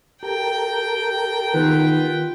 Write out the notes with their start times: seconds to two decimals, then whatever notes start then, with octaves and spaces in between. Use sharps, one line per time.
0.23 G4 A4 A#4 G5
1.54 D#3 B3 F4 B4